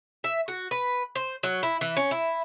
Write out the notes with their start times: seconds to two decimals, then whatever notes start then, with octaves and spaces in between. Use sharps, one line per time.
0.24 E5
0.48 F#4
0.71 B4
1.15 C5
1.43 F#3
1.63 E4
1.81 E3
1.97 C#4
2.11 E4